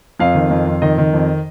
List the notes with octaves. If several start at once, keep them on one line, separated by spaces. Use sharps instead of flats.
F2 F5
D#3
F2
F2
D#3 D#5
D#3
F2